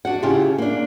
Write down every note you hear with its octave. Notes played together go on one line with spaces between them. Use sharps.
D4 F#4 F#5
C#3 E4 F4 G4 A5
A#3 D4